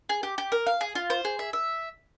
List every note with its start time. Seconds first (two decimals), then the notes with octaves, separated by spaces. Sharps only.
0.09 G#4
0.23 G4
0.38 G4
0.52 A#4
0.67 F5
0.81 G#4
0.95 F4
1.10 C5
1.25 G#4
1.39 E5
1.53 E5